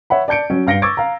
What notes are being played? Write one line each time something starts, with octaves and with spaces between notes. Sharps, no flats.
C#5 E5 F#5 B5
D5 A5 G6 C#7 D7
F#3 C#4
G2 F5 A#6 C#7 D7 G7
C#6 D6 E6 G#6 A6 D7
F5 A#5